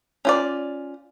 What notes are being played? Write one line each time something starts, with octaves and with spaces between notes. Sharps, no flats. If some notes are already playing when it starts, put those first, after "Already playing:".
C#4 F4 D5